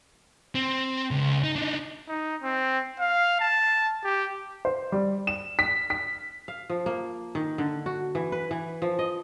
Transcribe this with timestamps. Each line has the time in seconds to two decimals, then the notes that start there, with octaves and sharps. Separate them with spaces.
0.55 C4
1.11 C#2
1.44 D#4
1.56 D4 D#4
2.09 D#4
2.43 C4
2.99 F5
3.40 A5
4.04 G4
4.65 C5
4.92 G3
5.27 E7
5.59 B6
5.90 B6
6.48 F5
6.70 F3
6.86 A#3
7.35 D#3
7.58 D3
7.86 F#4
8.15 E3
8.32 B4
8.51 E3
8.82 F3
8.99 D#5